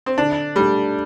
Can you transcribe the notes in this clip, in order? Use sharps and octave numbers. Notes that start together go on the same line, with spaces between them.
C4
D3 D4
G3 A3 D4